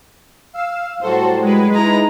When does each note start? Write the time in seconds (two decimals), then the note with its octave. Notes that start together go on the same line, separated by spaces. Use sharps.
0.53 F5 E6
1.01 A2 F#3 G3 F#4 A4 C5
1.42 G#3 B4
1.75 D#4 E4 G#4 A#5